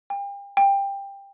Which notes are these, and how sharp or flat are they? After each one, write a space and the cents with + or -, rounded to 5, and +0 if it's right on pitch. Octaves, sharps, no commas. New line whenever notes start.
G5 +35
G5 +15